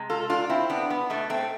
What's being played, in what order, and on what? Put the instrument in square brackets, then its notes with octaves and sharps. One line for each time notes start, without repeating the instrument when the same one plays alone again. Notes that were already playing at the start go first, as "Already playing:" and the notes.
Already playing: [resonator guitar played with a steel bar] C3 G#3
F4 A4
D4 F4
C4 E4
B3 D4
B3
B2 A3
A3 C4